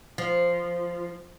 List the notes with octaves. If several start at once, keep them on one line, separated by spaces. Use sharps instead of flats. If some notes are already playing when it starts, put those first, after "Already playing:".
F3